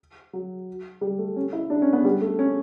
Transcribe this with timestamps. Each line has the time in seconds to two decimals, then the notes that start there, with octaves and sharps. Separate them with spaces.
0.33 F#3
1.01 G3
1.18 A3
1.36 C#4
1.53 E4
1.70 D4
1.82 C#4
1.93 B3
2.05 G3
2.21 A3
2.39 C#4